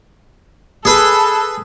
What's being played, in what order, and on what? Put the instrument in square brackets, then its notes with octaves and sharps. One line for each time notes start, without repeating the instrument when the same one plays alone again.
[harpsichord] G#4 B4 [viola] A4